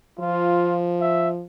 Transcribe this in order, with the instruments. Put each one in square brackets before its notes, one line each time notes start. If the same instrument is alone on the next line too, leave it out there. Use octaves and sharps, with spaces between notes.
[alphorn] F3 [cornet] F4
[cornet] E5